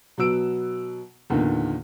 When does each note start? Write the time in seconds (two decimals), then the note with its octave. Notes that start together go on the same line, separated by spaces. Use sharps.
0.18 B2 F#3 B3 E6 D7
1.30 E2 A#2 D3 D#3